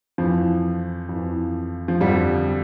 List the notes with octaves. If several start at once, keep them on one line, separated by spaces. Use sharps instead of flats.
F2 E3 F3
F2 E3
F3
F2 D3 F3 G3